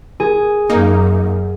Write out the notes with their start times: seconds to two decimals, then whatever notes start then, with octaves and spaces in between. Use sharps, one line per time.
0.20 G#4
0.70 F#2 A#3 D#4